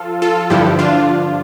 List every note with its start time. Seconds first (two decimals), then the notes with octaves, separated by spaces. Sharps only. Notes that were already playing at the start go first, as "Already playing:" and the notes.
Already playing: F3 F4 A4
0.22 F4 A4
0.50 G2 D3 F3 E4 G4
0.79 D4 F4